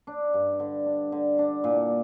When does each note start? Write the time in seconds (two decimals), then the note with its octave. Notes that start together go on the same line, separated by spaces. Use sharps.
0.07 D4
0.34 G2
0.60 D3
0.86 D4
1.12 D3
1.38 D4
1.64 A#2